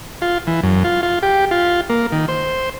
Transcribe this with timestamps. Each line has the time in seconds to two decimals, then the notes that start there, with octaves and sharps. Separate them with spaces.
0.22 F4
0.47 E3
0.63 F#2
0.84 F4
1.03 F4
1.23 G4
1.51 F4
1.90 A#3
2.12 D#3
2.28 C5